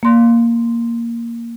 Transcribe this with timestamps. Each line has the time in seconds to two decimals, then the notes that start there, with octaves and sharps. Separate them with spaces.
0.03 A#3 C6